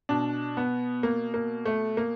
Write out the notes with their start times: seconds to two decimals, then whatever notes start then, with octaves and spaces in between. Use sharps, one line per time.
0.09 B2 D4
0.57 B3
1.03 A#3
1.34 A#3
1.65 A3
1.97 A#3